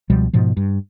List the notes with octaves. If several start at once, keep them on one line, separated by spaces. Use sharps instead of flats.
C#2 B2 F3 G3
G#2 B2 F3
G2